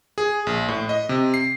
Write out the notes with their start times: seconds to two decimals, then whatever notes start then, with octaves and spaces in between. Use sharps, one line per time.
0.18 G#4
0.47 A#1
0.68 A2
0.89 D#5
1.09 C3
1.34 C7